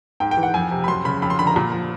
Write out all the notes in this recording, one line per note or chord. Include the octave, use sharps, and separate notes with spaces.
G#2 G5
G5
E3
F#5
F2 G#5
C3
B5
F#2 C6
C#3 B5
F2 B5
C6
D3 B5
A#5
A#2
F3